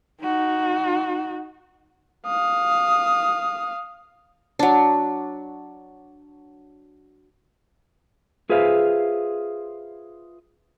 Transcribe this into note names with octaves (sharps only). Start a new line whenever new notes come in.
D#4 F#4
F5 D#6
F#3 D4
F4 G#4 B4 C5 E5 F5